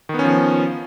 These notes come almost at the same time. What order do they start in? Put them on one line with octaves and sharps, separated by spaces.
D#3 B3 C#4 F3